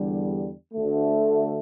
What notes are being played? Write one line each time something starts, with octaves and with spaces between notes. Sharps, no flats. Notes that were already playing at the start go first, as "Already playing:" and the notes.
Already playing: E2 D3 G3
D2 D3 A3